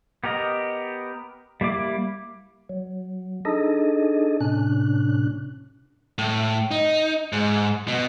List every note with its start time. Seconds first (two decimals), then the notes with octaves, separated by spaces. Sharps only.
0.24 B3 G4 A#4 D#5
1.61 G3 A#3 E4 D6
2.69 F#3
3.45 D4 D#4 G#4 A4 D#5
4.41 A2 C3 C#4 D4 F#6
6.18 A2
6.71 D#4
7.33 G#2
7.88 B2